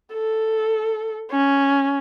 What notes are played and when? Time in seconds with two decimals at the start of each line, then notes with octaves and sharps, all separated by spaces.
0.13 A4
1.31 C#4